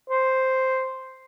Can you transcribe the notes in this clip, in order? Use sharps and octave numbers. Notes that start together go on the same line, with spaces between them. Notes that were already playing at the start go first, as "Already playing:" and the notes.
C5